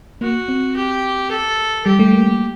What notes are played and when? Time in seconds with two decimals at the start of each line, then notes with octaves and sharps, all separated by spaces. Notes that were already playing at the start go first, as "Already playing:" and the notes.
0.21 A#3 F#4
0.48 C4
0.76 G4
1.31 A4
1.86 G3 G4
1.99 A3
2.13 A#3
2.28 A3